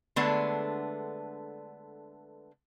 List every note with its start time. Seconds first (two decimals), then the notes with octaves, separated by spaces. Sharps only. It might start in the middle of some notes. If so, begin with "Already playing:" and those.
0.16 D3 G#3 A3 B3 D4